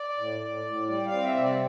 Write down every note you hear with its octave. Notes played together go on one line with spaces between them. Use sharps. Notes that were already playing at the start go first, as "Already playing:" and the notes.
Already playing: D5
A2
A2
A2
G3 D5
F5
C4
E5
C3
D5